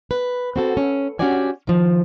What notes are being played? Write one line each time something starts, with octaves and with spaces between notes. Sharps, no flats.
B4
C4 F#4 A4
C#4
C#4 D4 F#4 G4 D5 G#5
D#3 F3